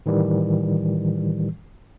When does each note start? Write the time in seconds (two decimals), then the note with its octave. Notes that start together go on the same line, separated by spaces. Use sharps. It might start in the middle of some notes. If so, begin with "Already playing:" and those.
0.06 A2 D#3 E3 G3